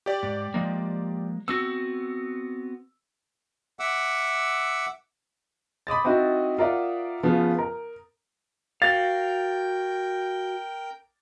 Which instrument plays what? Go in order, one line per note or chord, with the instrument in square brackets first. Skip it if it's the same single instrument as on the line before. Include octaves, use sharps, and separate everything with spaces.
[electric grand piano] G4 D5
[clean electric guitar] G#2
F3 G#3 A#3
[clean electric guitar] B3 C4 F#4 [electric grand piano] E6
[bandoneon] E5 F#5 D6 E6
[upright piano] B5 D6 D#6 A6
C4 D#4 E4 F#4
F4 A#4 D5 E5 F#5
C#3 F3 B3 F4
A#4
[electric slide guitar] F#4 F5 [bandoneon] A#4 G5 G6 [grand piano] A6